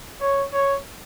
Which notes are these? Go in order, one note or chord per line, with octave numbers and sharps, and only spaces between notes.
C#5
C#5